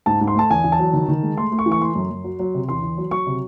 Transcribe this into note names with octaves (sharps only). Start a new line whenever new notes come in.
G#2 A5
G#2
C6
A3 A5
E2 G#5
E2
A5
F#3
D#3
D#3
G#3
A3 C6
A3
C#6
E3
C#6
A3 C6
F#2
F#2
F#3
F#3
C3
E2 C6
E2
F#3
F#3 C#6
C3